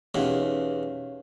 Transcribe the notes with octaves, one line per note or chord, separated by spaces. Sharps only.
E2 B2 C#4 D#4 G4 C#5 F5